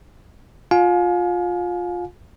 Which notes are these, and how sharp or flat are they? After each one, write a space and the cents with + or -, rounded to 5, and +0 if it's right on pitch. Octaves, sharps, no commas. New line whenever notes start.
F4 +15 F5 +30 G#5 +30